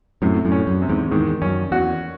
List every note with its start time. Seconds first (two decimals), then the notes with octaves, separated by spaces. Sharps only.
0.22 F#2 A2 C3
0.45 F#2 A2
0.52 C#4
0.67 F#2
0.82 C3
0.89 E2 G#2
1.11 E2 G#2 D#3
1.42 F#2 C#4
1.71 E2 F#4